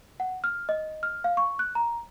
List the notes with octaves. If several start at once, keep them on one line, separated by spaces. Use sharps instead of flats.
F#5
F6
D#5
F6
F5
C#6
F#6
A#5